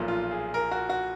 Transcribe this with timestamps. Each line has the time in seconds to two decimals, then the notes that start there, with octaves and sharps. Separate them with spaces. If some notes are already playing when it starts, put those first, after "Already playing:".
Already playing: B1 A#2 F3
0.08 F4
0.31 G#4
0.54 A#4
0.71 F#4
0.90 F#4